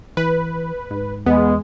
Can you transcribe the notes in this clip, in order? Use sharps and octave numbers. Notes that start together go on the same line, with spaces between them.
E3 B4
G#2
E2 G#3 B3